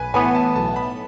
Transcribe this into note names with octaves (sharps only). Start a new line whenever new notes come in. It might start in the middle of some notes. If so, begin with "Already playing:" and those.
Already playing: B1 B4 G#5
A2 E3 B3 G#5
A5
B1 A5
B5